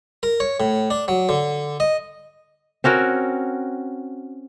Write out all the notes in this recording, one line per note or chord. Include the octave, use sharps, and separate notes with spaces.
A#4
C#5
A2
D4
F#3
D3
D#5
C4 C#4 F#4 A#4